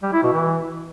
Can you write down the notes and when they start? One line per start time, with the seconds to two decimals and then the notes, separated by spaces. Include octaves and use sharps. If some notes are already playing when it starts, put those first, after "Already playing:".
0.03 G3
0.13 E4
0.23 B2
0.33 E3